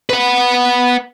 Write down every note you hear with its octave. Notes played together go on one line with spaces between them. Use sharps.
B4 F#5